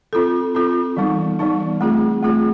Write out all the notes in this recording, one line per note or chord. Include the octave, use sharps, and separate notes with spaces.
C4 F4 A4
C4 F4 A4
E3 G3 B3 D#4
E3 G3 B3 D#4
A3 C4 F4 G#4
A3 C4 F4 G#4